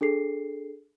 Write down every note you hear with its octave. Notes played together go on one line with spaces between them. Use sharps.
D4 G#4 A4 C7